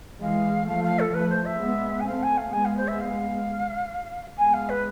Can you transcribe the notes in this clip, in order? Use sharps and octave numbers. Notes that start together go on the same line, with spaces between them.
E3 G#3 F5
F3 A3 F5
F5
A4
F3 A3 B4
C5
E5
G#3 B3
G#5
A3 C4 F5
G#5
F5
G#3 B3 G#5
F5
C5
E5
F5
G#3 B3 G#5
F5
B4